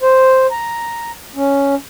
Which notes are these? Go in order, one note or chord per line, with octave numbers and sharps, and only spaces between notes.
C5
A#5
C#4